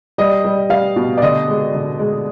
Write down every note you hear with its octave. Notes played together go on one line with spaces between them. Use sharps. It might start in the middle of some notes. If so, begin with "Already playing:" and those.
G3 D#5
G3
G3 F5
B2
D5
D3 D#5
G#3
D3
G#3